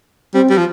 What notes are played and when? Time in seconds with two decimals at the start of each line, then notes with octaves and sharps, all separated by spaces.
0.34 G3 C4
0.50 G3
0.58 F3